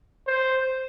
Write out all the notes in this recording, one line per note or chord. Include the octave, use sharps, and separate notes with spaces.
C5